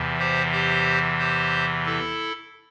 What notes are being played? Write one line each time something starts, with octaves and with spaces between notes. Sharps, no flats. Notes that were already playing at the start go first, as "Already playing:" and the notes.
Already playing: E2 C3 E3
G4 C5
G4 C5
G4 C5
E4 A4